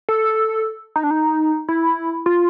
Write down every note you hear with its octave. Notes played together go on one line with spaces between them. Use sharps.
A4
D#4
D4
D#4
E4
F4